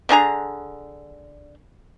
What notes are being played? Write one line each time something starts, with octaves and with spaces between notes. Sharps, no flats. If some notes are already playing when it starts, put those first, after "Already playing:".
D3 D4 G#4 A#5